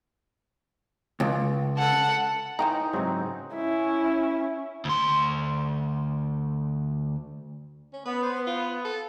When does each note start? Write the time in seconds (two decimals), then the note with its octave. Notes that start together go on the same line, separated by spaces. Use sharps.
1.20 C#2
1.77 A4 F#5
2.59 E3 C#4 D#4 C5 G5 A#5
2.93 G#2 C#3 F#3 C4
3.55 C#4 E4
4.85 D2 C6
7.93 C#4
8.05 B3 B4
8.23 C5
8.47 F4
8.85 A4